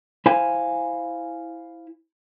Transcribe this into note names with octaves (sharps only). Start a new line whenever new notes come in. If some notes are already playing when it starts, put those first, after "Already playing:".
E4 C5 F5 G#5